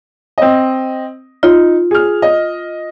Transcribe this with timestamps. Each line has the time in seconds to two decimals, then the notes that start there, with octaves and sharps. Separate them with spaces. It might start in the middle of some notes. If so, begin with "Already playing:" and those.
0.38 C4 D#5
1.43 D#4 F4
1.91 G#4 F6
2.22 D#5